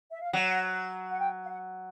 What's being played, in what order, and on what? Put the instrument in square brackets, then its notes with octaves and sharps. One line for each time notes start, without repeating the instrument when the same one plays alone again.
[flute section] E5
F5
[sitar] F#3 [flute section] F#5
[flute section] F#5
G5
F5
F#5